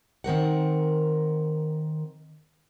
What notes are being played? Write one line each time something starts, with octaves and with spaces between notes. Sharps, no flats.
D#3 C4 A#4 F#5